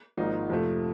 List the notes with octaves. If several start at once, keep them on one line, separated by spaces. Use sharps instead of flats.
G#1 G#2 F3 A#3 D#4
F2 C3 F3 A3